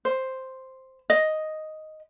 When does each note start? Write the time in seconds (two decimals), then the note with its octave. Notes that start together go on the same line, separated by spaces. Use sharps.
0.05 C5
1.10 D#5